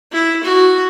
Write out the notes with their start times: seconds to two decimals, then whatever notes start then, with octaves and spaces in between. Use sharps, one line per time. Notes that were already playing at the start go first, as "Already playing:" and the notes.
0.12 E4
0.43 F#4